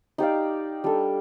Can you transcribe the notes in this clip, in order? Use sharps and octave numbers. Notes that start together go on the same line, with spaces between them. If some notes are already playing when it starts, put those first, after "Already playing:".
D#4 G4 D5 F5
G3 D4 A4